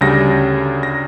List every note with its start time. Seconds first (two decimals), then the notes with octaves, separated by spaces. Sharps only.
0.01 D2 C#3 G3 A#6
0.83 A#6